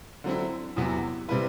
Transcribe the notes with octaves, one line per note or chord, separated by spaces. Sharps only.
D3 F#3 C4 E4
E2 C3 F#3 B3 E4
C3 G3 C4 E4 B4